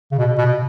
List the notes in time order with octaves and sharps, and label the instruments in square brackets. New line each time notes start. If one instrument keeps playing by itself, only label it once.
[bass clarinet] C#3
B2
B2